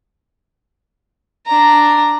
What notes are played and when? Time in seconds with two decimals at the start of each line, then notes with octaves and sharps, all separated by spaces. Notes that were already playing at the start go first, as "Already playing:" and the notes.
1.46 D4 A#5